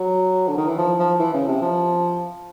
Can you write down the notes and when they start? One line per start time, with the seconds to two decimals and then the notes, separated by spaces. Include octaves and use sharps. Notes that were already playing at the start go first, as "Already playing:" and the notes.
Already playing: F#3
0.48 D3
0.57 D#3
0.67 E3
0.78 F3
0.99 F3
1.19 E3
1.34 C#3
1.48 C3
1.61 F3